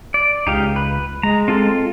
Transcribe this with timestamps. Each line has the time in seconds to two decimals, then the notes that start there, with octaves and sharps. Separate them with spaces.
0.14 D5
0.47 C#2 D#4 G4 F5
0.76 B4
1.23 G#3 A#5
1.48 C4 F4 A4